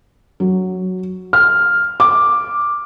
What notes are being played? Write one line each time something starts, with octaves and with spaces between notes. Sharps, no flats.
F#3
F6
D6